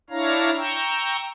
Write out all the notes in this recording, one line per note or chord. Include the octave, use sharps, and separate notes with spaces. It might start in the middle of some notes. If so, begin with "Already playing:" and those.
D4 E4 C#5 F5 A#5
G5 A#5 C#6 E6